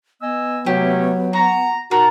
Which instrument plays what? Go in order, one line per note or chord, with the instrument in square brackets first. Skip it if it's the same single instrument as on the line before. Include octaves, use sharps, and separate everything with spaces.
[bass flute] B3 [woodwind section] D#5 G#5 E6
[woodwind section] C3 A3 C#4 [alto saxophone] F#3 [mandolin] G4
[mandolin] F#4 [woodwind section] A#5
[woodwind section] B2 D#4 A5 [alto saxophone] F#4 [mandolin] A#4